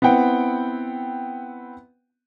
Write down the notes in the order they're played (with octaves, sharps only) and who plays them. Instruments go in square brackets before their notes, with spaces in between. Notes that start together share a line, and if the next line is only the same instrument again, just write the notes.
[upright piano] B3 C4 E4 F#5 G5